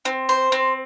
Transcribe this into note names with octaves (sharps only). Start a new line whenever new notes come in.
C4
C5
C4